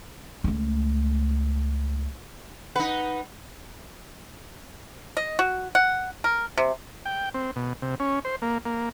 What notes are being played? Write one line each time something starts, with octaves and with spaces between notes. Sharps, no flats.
C#2 A3
D#4 B4 F#5
D#5
F#4
F#5
A#4
C3
G5
C4
B2
C3
C#4
C5
A#3
A#3